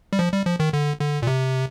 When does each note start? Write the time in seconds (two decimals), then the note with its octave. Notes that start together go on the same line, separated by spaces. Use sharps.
0.13 G3
0.19 F3
0.32 G3
0.46 F3
0.60 D#3
0.73 D3
1.00 D3
1.22 A#2
1.27 C3